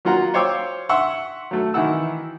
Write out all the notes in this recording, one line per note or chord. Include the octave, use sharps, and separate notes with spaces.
F#3 A#3 F4 F#5 A#5
C5 C#5 F5 G5 D6 E6
E5 F#5 C6 C#6 E6
F#3 A3
D#3 E3 E4 F#5 E6